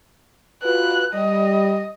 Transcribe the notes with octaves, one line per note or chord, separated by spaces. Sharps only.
F4 F#4 B4 F#6
G3 D#5